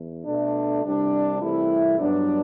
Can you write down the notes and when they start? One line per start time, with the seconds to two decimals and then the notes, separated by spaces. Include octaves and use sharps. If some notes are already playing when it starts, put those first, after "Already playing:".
Already playing: E2
0.25 B2 A3 D4
0.83 C2 C3 G3 D4
1.40 C2 C3 E3 A3 E4
1.98 G2 F#3 B3 D4